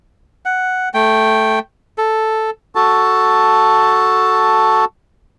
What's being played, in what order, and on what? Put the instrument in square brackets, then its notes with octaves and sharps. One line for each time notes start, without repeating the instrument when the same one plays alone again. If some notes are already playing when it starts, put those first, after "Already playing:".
[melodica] F#5
A3 G5
A4
[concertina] F#4 A4 A5